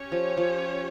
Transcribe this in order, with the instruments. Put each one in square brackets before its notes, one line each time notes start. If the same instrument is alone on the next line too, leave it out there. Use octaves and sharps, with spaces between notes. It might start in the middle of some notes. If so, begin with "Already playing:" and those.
Already playing: [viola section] C#4 G4 C#5
[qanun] F3
F3